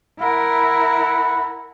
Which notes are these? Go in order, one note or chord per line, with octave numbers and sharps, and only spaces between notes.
E4 A#4 E5 F#5 B5